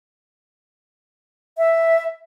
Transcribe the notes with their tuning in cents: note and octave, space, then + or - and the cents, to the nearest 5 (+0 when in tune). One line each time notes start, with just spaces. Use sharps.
E5 +0